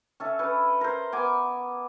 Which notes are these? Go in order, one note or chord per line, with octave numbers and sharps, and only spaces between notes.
C#4 A4 E5
C#4 B4
A#4 C5
B3 G#5 D6